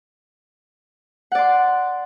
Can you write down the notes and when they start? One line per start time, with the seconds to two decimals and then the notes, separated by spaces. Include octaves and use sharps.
1.32 F#5
1.35 D5
1.38 C6